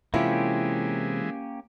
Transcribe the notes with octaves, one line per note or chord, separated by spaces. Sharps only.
C3 E3 G#3 A#3 C#4 E4 F4 G4